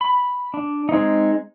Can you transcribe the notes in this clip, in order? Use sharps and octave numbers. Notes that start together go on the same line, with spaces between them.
B5
D4
G#3 C4 D#4